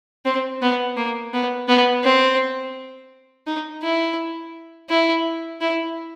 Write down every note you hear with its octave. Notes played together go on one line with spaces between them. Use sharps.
C4
B3
A#3
B3
B3
C4
D#4
E4
E4
E4